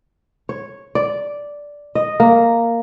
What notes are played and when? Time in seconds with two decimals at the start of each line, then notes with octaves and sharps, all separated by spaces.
0.49 C#5
0.95 D5
1.95 D#5
2.20 A#3